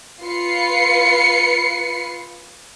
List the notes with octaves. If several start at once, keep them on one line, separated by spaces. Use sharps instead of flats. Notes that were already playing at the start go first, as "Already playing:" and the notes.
F4 B4 C7 C#7